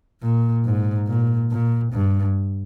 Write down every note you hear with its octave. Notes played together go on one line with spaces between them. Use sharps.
A#2
G#2
A#2
A#2
G2